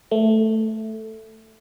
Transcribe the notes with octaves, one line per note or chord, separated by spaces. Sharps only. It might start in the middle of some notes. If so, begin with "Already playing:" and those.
A3